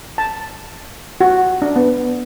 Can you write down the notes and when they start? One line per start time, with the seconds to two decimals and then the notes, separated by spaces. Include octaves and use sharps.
0.18 A5
1.21 F#4
1.62 D4
1.76 B3